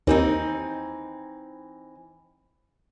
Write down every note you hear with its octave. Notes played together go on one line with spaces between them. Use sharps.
D#2 E3 C4 D#4